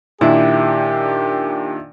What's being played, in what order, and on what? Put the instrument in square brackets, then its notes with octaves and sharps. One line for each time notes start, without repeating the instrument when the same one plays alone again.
[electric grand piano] A#2 D#3 D4 [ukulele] E4 [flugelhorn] G4